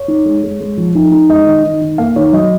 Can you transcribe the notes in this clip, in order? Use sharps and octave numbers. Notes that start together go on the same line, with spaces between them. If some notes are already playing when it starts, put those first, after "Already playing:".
Already playing: C#5
D#4
G#3
G#3
G#3
F3
D#4
D#4
G#3 D#5
D#3
D#3
D#3
A#3 F5
D#3 C#5
F#3 D#5